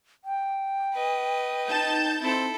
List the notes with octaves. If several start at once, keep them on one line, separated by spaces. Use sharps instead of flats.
G5
B4 D#5
D#4 A5 G6
C4 E4 A4